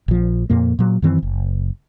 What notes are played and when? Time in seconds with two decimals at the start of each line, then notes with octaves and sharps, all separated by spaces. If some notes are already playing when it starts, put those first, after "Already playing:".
0.08 A#1 F3
0.50 F2 A#2 A#3
0.79 A#2 F#3
1.02 F#2 D#3 E3 C4
1.23 F#1